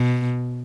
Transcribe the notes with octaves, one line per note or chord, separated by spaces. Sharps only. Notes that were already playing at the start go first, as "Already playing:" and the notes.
Already playing: B2